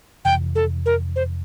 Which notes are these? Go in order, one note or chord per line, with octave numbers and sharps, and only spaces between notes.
F2 C3 E3 G5
A4
A#4
C5